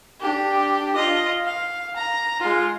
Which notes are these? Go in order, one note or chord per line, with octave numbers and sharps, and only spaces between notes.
D4 G4
F4 D#5
F5
A#5
G#3 F4